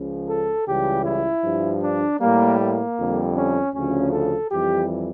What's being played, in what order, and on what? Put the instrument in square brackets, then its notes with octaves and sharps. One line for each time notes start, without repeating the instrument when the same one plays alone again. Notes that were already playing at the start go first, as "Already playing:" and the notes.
Already playing: [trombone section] C#2 C#3 F3
A4
C#2 C#3 E3 G3 G4
E4
G2 F3
D4
A2 G3 A#3
A#3
F2 D3 G3
C#4
D2 C#3 F3 C#4
A4
F2 E3 G3 G4